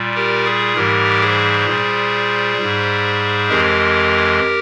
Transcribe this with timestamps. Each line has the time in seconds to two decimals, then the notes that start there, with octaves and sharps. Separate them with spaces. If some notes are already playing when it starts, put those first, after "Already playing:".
Already playing: A#2 G3
0.15 G4 A#4
0.45 G#4
0.76 G#2 E3 G3 G4 A#4
1.22 G#4 C5
1.67 A#2 G3
2.58 G#2 G3
3.49 F2 E3 G#3 G4 A#4